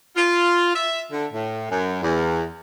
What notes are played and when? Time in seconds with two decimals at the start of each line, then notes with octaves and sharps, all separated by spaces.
0.16 F4
0.75 E5
1.11 D3
1.33 A2
1.70 F#2
2.02 E2